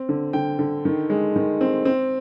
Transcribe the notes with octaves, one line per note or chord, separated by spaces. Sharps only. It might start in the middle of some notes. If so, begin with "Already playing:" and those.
Already playing: C4
D3
D3 G5
D3
D#3
G#3
D#3
C4
C4